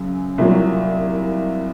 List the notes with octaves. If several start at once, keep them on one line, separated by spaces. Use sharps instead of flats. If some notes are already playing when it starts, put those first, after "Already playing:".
Already playing: F#2 C#3 F#3
C2 A#2 F#3